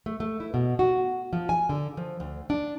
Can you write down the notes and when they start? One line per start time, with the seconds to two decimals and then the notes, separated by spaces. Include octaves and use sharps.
0.06 A3
0.20 A3
0.40 E4
0.54 B2
0.79 F#4
1.33 F3
1.49 G#5
1.69 D3
1.97 F3
2.20 D2
2.50 D4